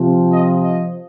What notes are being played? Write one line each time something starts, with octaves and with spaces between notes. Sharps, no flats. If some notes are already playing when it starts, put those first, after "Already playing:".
Already playing: C3 F3
D#5
D#5